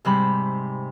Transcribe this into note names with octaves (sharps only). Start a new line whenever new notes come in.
G#2 C3 G3 B5